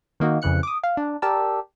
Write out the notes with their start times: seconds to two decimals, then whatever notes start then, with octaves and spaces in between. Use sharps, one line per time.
0.20 D#3 A#3 D#4 F#4
0.42 F2 C#3 E3 F#6 C#7
0.63 D6 D#6
0.83 F5
0.97 D4
1.22 G4 A#4 D5 A5 E6